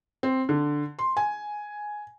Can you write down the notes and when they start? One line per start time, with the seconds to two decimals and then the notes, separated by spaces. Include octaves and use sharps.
0.23 C4
0.49 D3
0.99 C6
1.17 G#5